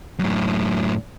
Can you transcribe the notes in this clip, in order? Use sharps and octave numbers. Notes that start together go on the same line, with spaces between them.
F#2 A2